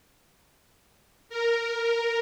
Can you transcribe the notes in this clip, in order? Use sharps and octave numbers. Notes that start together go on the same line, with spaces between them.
A#4